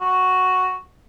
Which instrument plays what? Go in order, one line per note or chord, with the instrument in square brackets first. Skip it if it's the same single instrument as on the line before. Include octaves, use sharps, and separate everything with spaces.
[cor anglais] F#4